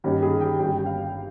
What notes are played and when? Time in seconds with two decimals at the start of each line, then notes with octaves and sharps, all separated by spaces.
0.04 G2 D#3 A#3 C#4
0.22 G#4
0.41 G5
0.59 G1 G2 G3 C#4 G5
0.78 G5
0.86 F5